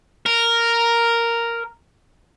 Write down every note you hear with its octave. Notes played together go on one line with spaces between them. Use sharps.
A#4